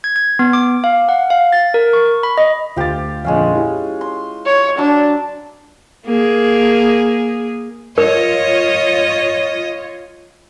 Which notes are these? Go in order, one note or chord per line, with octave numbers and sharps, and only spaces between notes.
G#6
G#6
B3
D6
F5
F#5
F5
A6
A#4
C#6
B5
D#5
D2 F4 G4 A6
F2 A#2 D3 G#3 C#4 F5
E4 G4
C6
C#5
F#3 D4
A#3 G#4
F4 A#4 C#5 D#5